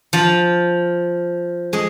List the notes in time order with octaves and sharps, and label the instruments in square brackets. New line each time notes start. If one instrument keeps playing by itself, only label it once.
[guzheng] F3 F4
G#3 G#4